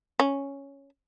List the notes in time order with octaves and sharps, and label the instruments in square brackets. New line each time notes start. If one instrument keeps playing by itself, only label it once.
[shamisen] C#4